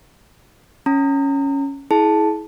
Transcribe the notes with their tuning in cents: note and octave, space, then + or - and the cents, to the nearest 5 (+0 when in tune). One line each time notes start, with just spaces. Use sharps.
C#4 +0 A#5 -30
E4 -25 G#4 +30 A5 +0